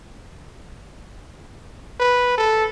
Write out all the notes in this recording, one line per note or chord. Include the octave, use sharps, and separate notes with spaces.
B4
A4